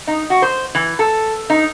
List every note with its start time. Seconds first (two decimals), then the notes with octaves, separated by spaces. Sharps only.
0.07 D#4
0.30 F#4
0.42 C5
0.75 E3
0.99 A4
1.50 D#4